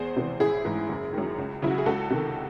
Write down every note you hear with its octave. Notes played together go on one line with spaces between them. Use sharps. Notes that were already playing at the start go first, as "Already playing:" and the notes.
Already playing: E2 G#4 C5
C3 E3
A1 E4 G#4
G#2 E3
F#1
F#2 D#3
C#2
C#3 F#3 E4
F#4
G#4
C#2 F#4 A4
C3 D#3